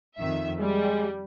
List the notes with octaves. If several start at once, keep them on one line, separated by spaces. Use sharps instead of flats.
F2 D#3 E5
G3 G#3